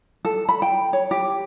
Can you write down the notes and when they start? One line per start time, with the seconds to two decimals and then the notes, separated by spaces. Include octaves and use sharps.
0.25 A4
0.49 B5
0.62 G5
0.93 C#5
1.11 G4